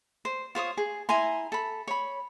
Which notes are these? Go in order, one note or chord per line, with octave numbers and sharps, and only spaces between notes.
C5
F4 C5 C#5 D#6
G#4
E4 G#5 A#5 C6
A4 B5
C#5 B5